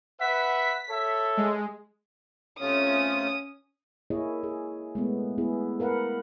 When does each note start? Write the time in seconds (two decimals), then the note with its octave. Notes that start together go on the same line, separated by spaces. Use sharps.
0.20 B4 E5 F#5 B6
0.90 A4 C#5 E5
1.37 G#3
2.60 C3 A3 C#4 F4 C#5 D#6
4.10 A#3 E4 G#4 C#5 D#5
4.43 G#4
4.95 G#3 A3 B3
5.38 B3 E4 G#4
5.80 A#4 B4 F5 F#5